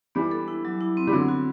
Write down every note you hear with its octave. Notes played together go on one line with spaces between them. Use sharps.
E3 G3 B3
A4
E4
F#3
E4
C4
G3
D3 F#3 B3
F#4